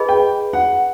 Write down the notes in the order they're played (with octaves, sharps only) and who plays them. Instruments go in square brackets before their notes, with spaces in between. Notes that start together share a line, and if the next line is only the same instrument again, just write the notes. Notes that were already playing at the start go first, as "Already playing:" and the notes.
Already playing: [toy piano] G#4 B4 D#5 G#5 B5
[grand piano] G5
F#5